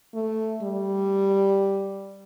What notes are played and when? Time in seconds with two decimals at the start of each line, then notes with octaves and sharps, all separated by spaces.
0.14 A3
0.63 G3